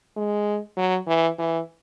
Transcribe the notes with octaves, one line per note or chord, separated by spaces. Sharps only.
G#3
F#3
E3
E3